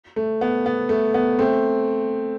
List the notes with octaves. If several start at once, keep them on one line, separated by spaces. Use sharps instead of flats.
A3
B3
B3
A3
B3
A3 C4